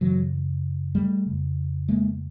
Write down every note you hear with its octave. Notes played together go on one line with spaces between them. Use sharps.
F#2 C#3 E3 F#3
G3 A3
F2 C#3
G#3 A#3